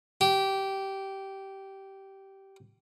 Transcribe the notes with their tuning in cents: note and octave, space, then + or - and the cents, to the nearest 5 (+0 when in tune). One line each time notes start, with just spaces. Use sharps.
G4 -15